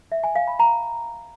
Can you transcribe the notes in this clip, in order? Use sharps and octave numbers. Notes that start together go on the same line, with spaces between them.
E5
G#5
F5
B5
A#5